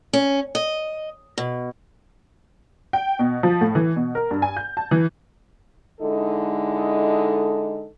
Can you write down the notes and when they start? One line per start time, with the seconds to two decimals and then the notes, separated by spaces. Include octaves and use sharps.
0.13 C#4
0.55 D#5
1.38 B2
2.93 G5
3.19 B2
3.43 F3
3.61 A2
3.75 E3
3.96 B2
4.15 A#4
4.31 G2
4.42 G#5
4.57 G6
4.77 A5
4.91 E3
6.00 D3 G#3 D#4 E4 A4